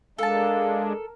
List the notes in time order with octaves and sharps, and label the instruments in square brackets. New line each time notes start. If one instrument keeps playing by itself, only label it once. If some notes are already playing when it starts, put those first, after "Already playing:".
[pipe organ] G#3 D4 [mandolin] A4 A5 [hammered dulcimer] A#4 [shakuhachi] F5